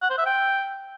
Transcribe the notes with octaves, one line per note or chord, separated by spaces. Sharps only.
F#5
C5
E5
G5